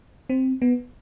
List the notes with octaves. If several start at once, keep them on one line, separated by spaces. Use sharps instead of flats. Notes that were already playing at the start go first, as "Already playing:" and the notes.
C4
B3